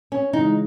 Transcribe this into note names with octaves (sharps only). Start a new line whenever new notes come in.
C#4
C#3 E3 G#3 D#4